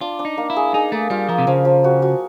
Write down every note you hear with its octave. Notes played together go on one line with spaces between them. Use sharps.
D4 F4
D4
D#4
A#3
E4
G#4
D#4 G#4
A3 A#3
G3 F4
F3 A#3
C3
C#3 F3
F3
F#4
F#4